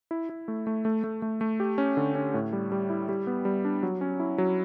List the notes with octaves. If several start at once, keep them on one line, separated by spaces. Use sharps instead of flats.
E4
E4
A3
A3
A3
A3
A3
A3
G4
C#4
D3
C#4
A2
G3
G3
E4
G3
B3
G3
D4
F#3
C#4
E4
F#3